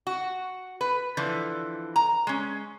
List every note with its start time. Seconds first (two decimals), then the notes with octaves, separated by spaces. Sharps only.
0.07 F#4
0.81 B4
1.17 D3 E3 F3
1.96 A#5
2.27 G#3 C#4